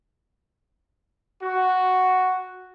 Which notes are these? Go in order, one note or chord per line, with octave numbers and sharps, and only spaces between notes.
F#4